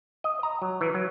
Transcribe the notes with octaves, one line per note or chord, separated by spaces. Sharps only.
D#5
A#5
F#3
E3
F#3